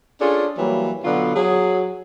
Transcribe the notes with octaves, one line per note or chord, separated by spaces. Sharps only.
C#4 D4 F4 G#4 A4
E3 F#3 G3 A#3
B2 D3 F#3 B3 F4
F#3 G#4